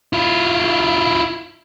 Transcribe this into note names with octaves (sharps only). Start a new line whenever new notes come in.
E4 F4